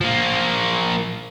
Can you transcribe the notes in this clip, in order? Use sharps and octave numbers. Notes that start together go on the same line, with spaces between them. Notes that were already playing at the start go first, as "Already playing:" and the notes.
F3 A#3